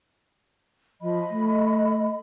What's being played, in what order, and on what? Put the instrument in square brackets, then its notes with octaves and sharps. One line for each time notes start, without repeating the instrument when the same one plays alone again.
[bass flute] F3 [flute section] D#5 B5
[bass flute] A3